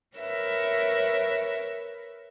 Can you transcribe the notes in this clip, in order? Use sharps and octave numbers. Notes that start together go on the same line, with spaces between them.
A#4 B4 C#5 E5